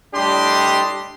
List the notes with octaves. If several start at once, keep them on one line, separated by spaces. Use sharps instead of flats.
A2 G3 D4 G4 D#5 C6